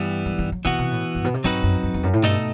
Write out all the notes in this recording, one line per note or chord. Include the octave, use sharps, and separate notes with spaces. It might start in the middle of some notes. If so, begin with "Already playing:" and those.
Already playing: G2 E3 G3 B3
F#2
D#3
F#3
C3 E3 B3 F#4
C3
A2
G2
B2
C3
G2 F#3 C4 D#4 F#4 B4
F#2
F#2
E2
F#2
A2
G2 B2 A3 D#4 A4 D#5